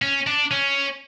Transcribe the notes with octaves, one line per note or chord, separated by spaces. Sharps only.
C#4
D4
C#4